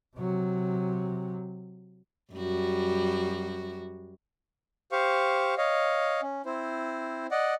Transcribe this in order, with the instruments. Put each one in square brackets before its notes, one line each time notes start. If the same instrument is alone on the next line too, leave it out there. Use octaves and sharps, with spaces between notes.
[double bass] C3 F#3
[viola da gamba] F#2 G3 F#4
[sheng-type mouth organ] G4 C5 F5 C#6
C#5 D#5 F5
C#4
C4 E4 C5
D5 D#5 F#5